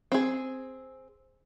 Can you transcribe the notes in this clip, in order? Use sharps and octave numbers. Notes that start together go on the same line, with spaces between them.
C4 G#4